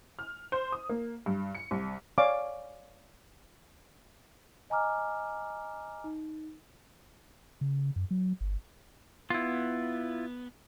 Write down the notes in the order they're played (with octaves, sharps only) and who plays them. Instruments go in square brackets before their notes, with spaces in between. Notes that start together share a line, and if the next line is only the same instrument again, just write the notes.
[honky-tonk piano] F6
C5
D#6
A#3
G2
C#7
C2
[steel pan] C#5 D5 F5 G#5 D6
[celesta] D#5 G#5 A#5 D6 F6
D#4
[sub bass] C#3
F#2
F#3
G1
[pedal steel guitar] B3 [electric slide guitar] E4 F4